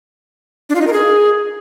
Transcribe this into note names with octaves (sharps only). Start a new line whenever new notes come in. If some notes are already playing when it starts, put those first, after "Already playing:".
D4
F4
D#4
A#4
G#4